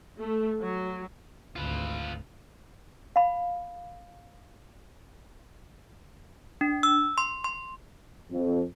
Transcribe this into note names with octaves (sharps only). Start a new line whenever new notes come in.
A3
F#3
G#1 D2 F4 B4
F5 B5
D4
E6
C6
C6
F2